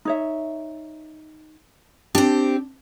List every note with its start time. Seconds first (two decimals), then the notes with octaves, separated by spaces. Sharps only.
0.05 D#4 C#5 E5
2.15 C4 D4 G4